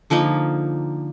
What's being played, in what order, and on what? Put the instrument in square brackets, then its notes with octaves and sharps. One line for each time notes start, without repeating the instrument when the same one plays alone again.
[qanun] D3 F3 A#3 D#4